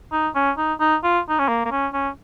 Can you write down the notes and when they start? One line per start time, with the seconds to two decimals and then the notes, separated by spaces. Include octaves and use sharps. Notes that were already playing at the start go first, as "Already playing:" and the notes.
0.12 D#4
0.35 C#4
0.58 D#4
0.80 D#4
1.03 F4
1.29 D#4
1.39 C#4
1.48 A#3
1.65 A#3
1.71 C#4
1.93 C#4